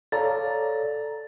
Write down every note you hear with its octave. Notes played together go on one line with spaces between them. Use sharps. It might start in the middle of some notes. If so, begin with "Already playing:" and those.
A4 C#5 D5 F5 A#5 A6